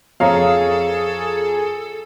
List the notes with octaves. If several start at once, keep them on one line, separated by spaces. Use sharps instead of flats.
F2 G#4 A4 C#5 F5 A#5